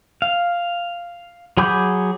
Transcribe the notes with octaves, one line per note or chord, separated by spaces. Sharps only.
F5
F#3 G#4 B5 D6 G6